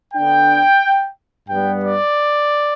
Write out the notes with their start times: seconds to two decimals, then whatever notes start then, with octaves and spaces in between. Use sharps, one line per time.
0.14 D3 B3 D4 G5
1.49 G2 G3 B3 G5
1.83 D5